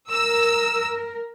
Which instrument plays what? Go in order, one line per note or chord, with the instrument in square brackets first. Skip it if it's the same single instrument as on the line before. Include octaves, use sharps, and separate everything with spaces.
[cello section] A#4 [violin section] E6